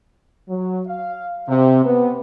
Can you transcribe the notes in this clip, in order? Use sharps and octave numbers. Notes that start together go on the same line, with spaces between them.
F#3
F5
C3
B3